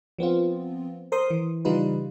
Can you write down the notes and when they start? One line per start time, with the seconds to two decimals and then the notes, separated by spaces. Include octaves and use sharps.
0.18 F3 B3 C4 F4
1.12 A#4 C5 C6 D#6
1.30 E3
1.65 C#3 E3 G3 D#4 F4 B4